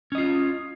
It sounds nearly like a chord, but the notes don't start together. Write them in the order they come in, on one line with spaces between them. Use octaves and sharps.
C#4 D#5 F4